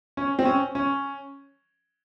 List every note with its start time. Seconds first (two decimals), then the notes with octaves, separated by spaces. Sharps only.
0.17 C#4
0.39 C4
0.45 C#4
0.75 C#4